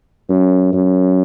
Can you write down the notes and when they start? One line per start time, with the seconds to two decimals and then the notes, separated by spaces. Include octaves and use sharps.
0.29 F#2
0.73 F#2